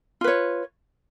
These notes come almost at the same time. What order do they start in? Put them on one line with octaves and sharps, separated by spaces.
F4 B4 C#5